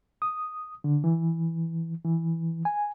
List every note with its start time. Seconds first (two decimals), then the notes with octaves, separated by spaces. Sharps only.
0.22 D#6
0.84 D3
1.04 E3
2.05 E3
2.65 G#5